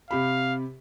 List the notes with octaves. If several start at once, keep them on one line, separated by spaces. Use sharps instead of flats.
C3 G4 F5 B5